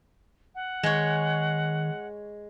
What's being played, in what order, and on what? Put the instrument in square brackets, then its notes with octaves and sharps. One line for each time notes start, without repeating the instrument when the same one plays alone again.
[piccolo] F#5
[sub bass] D#3 [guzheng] G#3 C#5